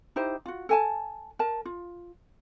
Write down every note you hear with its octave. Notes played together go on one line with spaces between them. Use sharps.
D#4 E4 G4 C5
F4 F#4
A4 G#5 A5
A#4 A5
F4